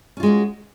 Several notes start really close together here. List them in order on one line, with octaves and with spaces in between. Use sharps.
C#4 F4 G#3 F#4